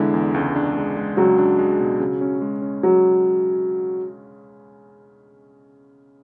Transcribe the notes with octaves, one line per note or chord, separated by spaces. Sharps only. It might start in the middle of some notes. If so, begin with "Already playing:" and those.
Already playing: E2 D3 G#3 E4
E2
C#2
D4
G#3
G#3
C#2 F#3
D4
G#3
B2
C#3
C#4
G#3
C#4
F#3 G#3